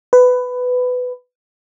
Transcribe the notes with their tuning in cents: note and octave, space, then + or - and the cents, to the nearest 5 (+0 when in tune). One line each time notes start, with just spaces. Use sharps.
B4 +15